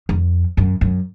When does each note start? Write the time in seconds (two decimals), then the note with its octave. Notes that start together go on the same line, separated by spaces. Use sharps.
0.09 F2
0.57 F#2
0.81 F#2